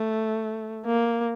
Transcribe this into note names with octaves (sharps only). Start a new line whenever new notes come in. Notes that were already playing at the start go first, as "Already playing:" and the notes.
Already playing: A3
A#3